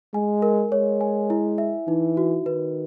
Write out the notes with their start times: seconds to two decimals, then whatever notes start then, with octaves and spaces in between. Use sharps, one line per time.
0.14 G#3 G#5
0.42 A#4
0.71 G#3 C#5
1.01 G#5
1.30 E4
1.58 E5
1.87 E3 D#4
2.17 F#4
2.46 D#3 B4